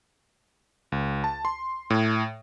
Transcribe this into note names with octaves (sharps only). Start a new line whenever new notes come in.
C#2
A5
C6
A2